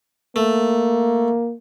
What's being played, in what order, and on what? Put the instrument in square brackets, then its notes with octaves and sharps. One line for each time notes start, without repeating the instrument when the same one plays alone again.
[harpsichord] A3 [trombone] A#3